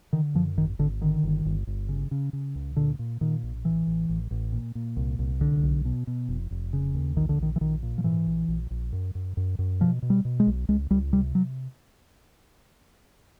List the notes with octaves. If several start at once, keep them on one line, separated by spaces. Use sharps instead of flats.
D3 D#3
F#2 F3
G#1 D#3
G#1 D3
D3 D#3
G1
G1
G1
C#3
C#3
C#3
C#2
A#2 D3
A#2
A#2 D#3
A#1
A1 E3
A1
A1
A1
A#2
A#2
C2
C2
B1 D3
B1
B2
B2
F1
F1
C#3
D#2
A#1 D#3
D3
A#1 D#3
E3
A#1 D#3
A#2
F3
G#2 E3
A#1
A#1
A#1
F#2
F#2
F#2
F#2
B2 F3
B2
G3
B2
G#3
B1
C#2 G#3
C#2 G3
C3 G3
F#3